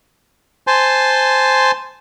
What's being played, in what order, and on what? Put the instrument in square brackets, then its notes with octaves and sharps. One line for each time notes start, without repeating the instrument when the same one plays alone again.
[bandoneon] C5 G#5 A5 C6